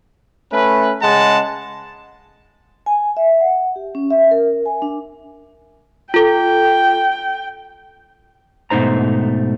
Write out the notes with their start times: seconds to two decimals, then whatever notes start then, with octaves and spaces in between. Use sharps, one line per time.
0.52 A3 C#4 B4
1.02 C#3 G#3 F#5 A5
2.86 G#5
3.17 E5
3.41 F#5
3.76 G4
3.95 C#4
4.11 E5
4.31 A#4
4.66 G#5
4.82 D4
6.14 F4 A4 G5
8.70 G#2 B2 A3 D#4 C5 A#5